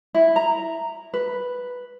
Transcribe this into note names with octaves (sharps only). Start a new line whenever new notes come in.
E4
A#5
B4